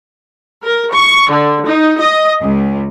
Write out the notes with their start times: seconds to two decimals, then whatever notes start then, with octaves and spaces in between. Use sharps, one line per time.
0.62 A#4
0.93 C#6
1.28 D3
1.67 D#4
1.98 D#5
2.42 C#2